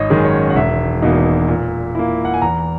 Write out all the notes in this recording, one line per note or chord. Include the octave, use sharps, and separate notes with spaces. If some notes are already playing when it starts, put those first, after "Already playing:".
Already playing: G#1 C#5 D#5
F#2 D#3 G#3 C#4
C#5
F#5
E1 E5
E2 B2 A#3 D#4
A#2
A#3 E4
F#5
G#5
E2 A#5